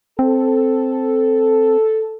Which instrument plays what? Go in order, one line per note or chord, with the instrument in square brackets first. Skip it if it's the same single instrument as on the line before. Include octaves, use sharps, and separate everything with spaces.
[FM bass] C4 [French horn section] A4